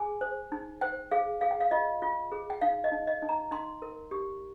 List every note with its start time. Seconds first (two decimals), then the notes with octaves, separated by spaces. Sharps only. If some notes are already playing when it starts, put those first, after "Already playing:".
Already playing: G#4 G#5
0.21 C5
0.52 D#4
0.81 C5 G5
1.11 G#4 F5
1.41 G#4 F5
1.51 G5
1.60 F5
1.71 F4 D#5
2.02 F4
2.32 G#4
2.50 G5
2.61 D#4 F5
2.84 D#5
2.92 D#4
3.07 D#5
3.22 D#4
3.29 A#5
3.51 D#4 C6
3.82 A#4
4.11 G4